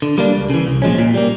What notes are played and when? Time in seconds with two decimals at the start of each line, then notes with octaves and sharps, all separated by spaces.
0.02 D3
0.18 G3 A#3 D4
0.34 C#2
0.50 C#3 E3
0.67 C2
0.82 A#2 F3 G#3 C#4
0.98 A#2
1.14 G3 A#3